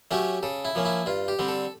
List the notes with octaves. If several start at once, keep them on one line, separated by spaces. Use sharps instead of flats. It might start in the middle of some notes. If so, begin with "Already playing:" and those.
F#3 A3 C#4 G4
C#3 A4
E4
F3 A#3 C#4
E4
G2 F4
G4
D3 G3 C4
A4